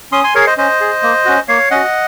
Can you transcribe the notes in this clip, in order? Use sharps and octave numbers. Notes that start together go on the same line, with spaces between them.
C#4 C6 D#6
G#5 C6
G#4 A#4 C#5
F5
C5 D#5
C#4 C5 D#5
G#4
A#3
C#4 F#4
A#3 C#5 F5
C#4 F#4 D#5 F#5